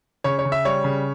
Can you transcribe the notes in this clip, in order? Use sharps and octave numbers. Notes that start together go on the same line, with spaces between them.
C#3 C#5
C#5
C#3
E5
G3 C#5
C#3